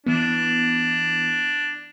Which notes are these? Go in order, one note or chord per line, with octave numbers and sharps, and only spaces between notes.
E3 B3 D4